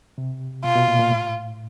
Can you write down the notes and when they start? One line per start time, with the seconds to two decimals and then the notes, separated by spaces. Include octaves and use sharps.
0.18 C3
0.64 B2 F4
0.76 B2
0.88 A#2
0.99 A#2
1.12 A2